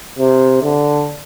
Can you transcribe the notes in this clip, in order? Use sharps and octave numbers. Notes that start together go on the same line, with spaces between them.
C3
D3